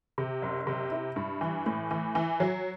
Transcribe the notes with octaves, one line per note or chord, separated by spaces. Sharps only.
C3
F#1
C3
E4
G2
E3
A2
E3
E3
F#3